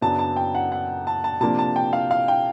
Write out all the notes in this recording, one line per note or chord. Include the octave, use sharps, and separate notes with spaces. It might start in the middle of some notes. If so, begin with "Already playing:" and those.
F#2 C#3 F#3 B3 D4 A5
A5
G5
F#5
F#5
A5
A5
C3 F3 A#3 D4 A5
A5
G5
F5
F5
G5